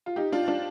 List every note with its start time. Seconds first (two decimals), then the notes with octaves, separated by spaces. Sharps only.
0.06 F4
0.16 D#4 G4
0.32 D4 F4
0.48 D4 F4